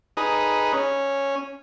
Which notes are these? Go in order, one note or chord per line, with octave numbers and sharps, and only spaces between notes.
D#4 G#4 B4
C#4